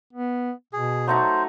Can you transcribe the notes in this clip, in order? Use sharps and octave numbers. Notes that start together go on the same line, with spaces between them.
B3
B2 G#4
F#3 A3 D#4 C5